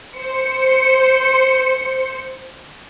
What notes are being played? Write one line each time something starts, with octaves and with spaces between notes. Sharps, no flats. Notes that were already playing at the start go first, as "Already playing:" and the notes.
C5 C#7